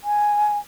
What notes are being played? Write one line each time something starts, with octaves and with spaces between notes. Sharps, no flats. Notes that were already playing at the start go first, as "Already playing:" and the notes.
G#5